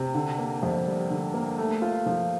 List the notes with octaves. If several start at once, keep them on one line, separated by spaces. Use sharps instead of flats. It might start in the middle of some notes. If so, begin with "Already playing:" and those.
Already playing: C3
D3
A#3
F2
G3
D3
A#3
A3
F4
F3